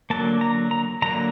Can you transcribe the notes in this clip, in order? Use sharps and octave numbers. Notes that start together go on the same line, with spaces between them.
D3 F#3 A#3 A5
A#5
A#5
D3 F#3 A#3 A#5